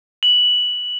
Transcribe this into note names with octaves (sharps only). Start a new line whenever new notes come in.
F#7